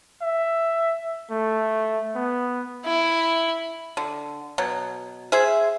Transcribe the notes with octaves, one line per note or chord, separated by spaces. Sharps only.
E5
A3
B3
E4
D3
B2 F#3
G#4 C5 E5